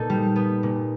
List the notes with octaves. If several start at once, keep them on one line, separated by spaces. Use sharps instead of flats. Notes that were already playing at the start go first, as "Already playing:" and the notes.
Already playing: A#2 B3 D#4 A4
G3
B3
A#2